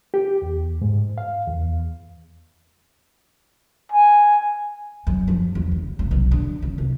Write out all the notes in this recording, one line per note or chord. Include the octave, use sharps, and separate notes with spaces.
G4
E2
G#2
F5
E2
G#5
F#2
F3
E2
C#3
F1
B1
D3
C#3
C2